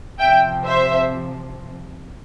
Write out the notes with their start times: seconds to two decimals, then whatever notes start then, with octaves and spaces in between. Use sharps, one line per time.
0.19 C3 F3 E5 G5
0.66 C5 E5